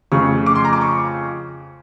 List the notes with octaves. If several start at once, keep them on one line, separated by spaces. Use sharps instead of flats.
F2 C#3 F3 A3 C#6
D6
C6
A#5
D6
C#6